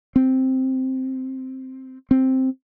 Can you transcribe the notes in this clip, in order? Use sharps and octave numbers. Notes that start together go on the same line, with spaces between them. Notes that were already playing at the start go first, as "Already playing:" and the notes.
C4
C4